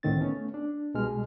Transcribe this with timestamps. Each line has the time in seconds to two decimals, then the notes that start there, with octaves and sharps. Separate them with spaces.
0.03 C#2 A2 D3 D#3 C4 A6
0.21 A3 B3 C#4
0.54 D4
0.94 C2 B2 G3 G#3 F6